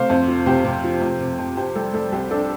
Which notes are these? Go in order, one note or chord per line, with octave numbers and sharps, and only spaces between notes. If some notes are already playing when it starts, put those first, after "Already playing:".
Already playing: C3 A3 C5 F5
F2
F3
C3 G4 C5
C3
F3
F2
C3
F2
F2 G4 C5
G3 A4
G3 A4
C2 G4 C5
D4 A4 D5